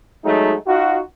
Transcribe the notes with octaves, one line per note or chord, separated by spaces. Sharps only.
F#3 G#3 A3 D#4
D#4 F4 F#4